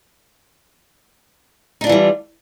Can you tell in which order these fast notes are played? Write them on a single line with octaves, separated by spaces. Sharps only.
D#4 D4 F4 E3 G3